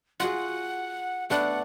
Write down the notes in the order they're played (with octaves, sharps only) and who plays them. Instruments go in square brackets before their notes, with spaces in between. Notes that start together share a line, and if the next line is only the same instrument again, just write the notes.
[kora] F4 F#4 G#4 [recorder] F#5
[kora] A3 B3 D4 [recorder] F#5